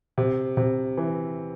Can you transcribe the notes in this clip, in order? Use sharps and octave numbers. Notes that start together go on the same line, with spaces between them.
C3
C3
E3